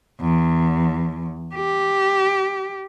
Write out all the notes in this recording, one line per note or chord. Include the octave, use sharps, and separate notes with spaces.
E2
G4